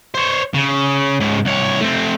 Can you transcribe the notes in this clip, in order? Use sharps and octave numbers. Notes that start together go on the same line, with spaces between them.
C5 C#5
C#3
G#2 C#3
C2 C#5
A3 C4